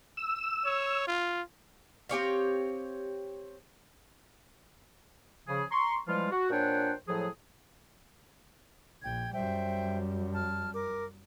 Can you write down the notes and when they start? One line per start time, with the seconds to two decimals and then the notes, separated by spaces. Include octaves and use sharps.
0.17 E6
0.65 C#5
1.07 F4
2.09 C4 G4 C#5 F5
5.48 C#3 F3 G#4
5.70 A#5 C6 C#6
6.07 E3 F3 G3 G#3 F4
6.31 F#4
6.50 A#2 D4 C5 C#5 F#5 G5
7.07 A2 F3 F#3 G#4
9.03 A#1 G5 G#6
9.33 F#2 G3 C5 E5 G5
10.34 A5 F6
10.73 A#4 D6